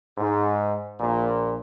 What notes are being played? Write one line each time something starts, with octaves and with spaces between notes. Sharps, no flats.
G#2
A#1 A#2